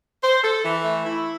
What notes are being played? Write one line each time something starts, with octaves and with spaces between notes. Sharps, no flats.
C5
A4
E3
A3
E4